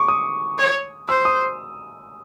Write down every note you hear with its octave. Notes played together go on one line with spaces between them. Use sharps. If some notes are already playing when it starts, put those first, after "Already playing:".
Already playing: C#6 D6
D#6
C#5
C5 E6
D#6